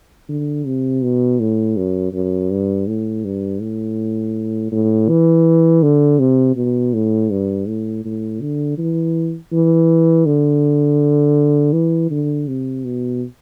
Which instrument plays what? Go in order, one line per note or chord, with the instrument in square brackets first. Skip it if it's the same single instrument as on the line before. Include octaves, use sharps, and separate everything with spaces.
[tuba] D3
C3
B2
A2
F#2
F#2
G2
A2
G2
A2
A2
E3
D3
C3
B2
A2
G2
A2
A2
D3
E3
E3
D3
E3
D3
C3
B2